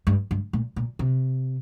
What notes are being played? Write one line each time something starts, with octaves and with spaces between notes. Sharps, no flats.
G2
G2
A#2
A#2
C3